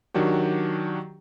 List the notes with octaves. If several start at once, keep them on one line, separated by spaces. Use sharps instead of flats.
D#3 F#3 D4 F#4 G4